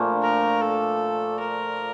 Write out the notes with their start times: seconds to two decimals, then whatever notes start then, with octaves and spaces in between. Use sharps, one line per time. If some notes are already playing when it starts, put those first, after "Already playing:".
Already playing: A#2 F3 A3 D4
0.23 A#4
0.61 A4
1.39 A#4